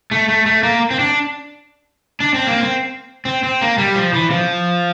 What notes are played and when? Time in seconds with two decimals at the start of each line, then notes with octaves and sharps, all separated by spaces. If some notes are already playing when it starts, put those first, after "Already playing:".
0.11 A3
0.28 A3
0.46 A3
0.63 A#3
0.91 C4
0.99 D4
2.20 D4
2.34 C4
2.47 A#3
2.60 C4
3.25 C4
3.43 C4
3.61 A#3
3.78 G3
3.95 F3
4.13 E3
4.30 F3